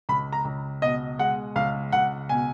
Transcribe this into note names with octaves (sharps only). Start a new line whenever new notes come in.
C#2 B5
A#5
C#2
B2 D#5
G#3 F#5
C#2 F5
C#2 F#5
B2 G#5